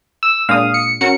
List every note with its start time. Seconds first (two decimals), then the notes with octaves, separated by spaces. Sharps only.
0.23 E6
0.49 A#2 G#3 D4 F5 D#6
0.74 C#7
1.01 C#4 F#4 A#4 C#7